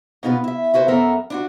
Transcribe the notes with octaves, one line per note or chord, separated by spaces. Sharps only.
B2 B3 D#4 F4 A4 B4
E4 E5
E4 F#4 B4 C5
F#2 B3 A4 A#4 E5
D4 E4 F#4